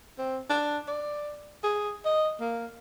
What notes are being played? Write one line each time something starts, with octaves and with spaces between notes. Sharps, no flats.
C4
D4
D5
G#4
D#5
A#3